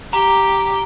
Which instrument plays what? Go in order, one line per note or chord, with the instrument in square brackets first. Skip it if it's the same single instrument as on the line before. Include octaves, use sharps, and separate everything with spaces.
[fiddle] G4 [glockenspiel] A#5